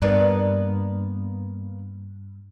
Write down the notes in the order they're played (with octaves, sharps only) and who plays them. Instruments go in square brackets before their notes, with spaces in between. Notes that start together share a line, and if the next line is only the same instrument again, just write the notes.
[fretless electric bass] G2 [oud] A#3 B3 D4